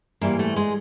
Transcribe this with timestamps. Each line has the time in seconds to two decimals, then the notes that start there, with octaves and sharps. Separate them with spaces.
0.21 G#2 E3 G3 A#3
0.39 A3
0.56 G#3